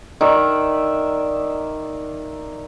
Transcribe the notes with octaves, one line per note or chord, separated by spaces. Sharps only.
D#3 D5 E5